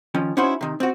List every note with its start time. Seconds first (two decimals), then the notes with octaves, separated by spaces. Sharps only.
0.14 D#3 F3 C#4
0.37 C#4 D#4 E4 F#4 C5 C#5
0.61 C3 D#3
0.80 C4 F#4